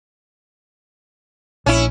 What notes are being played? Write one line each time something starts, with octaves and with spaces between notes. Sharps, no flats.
A#1 C#4 E4